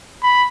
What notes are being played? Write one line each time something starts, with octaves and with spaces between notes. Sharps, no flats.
B5